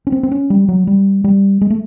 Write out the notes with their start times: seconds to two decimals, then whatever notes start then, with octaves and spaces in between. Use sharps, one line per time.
0.07 C#4
0.12 C4
0.23 C4
0.32 C#4
0.50 G3
0.69 F#3
0.87 G3
1.24 G3
1.61 G#3
1.70 A3